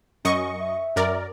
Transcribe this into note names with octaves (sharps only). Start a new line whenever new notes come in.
F#2 C#4 D#5 C#6
E5
F#2 A#4 D5